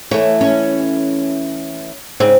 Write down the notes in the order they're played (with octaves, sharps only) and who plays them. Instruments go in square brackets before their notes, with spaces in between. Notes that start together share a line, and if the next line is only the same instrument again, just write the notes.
[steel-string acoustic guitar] E3 A3 [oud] C#5
[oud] C#4
[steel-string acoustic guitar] G#2 C#3 [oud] C4